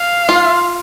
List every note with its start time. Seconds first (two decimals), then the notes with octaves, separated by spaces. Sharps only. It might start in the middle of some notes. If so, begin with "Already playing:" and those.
Already playing: F5
0.29 F4